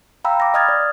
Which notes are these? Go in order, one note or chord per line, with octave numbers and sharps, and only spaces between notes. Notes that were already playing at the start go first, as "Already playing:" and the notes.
F5 G5 A#5 B5 E6
D6 A#6
D#5 D#6 F6 G#6 A6
D5